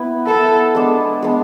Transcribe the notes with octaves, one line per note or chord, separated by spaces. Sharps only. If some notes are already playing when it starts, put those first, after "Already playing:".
Already playing: B3 E4 B4
B3 E4 A4 B4
G#3 B3 D4
G#3 B3 D4